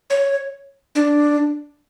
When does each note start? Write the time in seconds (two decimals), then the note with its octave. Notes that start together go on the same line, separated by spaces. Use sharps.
0.10 C#5
0.95 D4